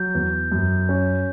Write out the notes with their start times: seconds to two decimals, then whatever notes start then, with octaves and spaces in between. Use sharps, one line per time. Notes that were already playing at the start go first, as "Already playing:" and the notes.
Already playing: F#3 G6
0.15 E2
0.52 F#2
0.89 C#4